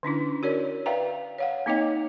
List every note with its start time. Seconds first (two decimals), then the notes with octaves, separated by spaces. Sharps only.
0.03 D3 C#4 D4 E4
0.43 F#4 A#4 C#5 D5
0.86 B4 D5 E5 F5 G5 A#5
1.38 C#5 F5 F#5
1.66 A#3 C4 D#4 C#5 D#5 G5